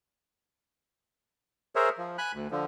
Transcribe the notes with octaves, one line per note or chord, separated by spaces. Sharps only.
G#4 A#4 C5 C#5 E5
F3
G#5 B5 F#6
D2
D3 F3